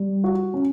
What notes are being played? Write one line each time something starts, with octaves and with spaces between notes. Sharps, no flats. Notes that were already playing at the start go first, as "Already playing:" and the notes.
Already playing: G3
F#4
C#4